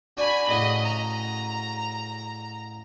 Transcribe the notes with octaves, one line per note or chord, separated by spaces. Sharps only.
D4 F#4 D5 G#5 B5
A1 C#3 F#4 D#5
A#5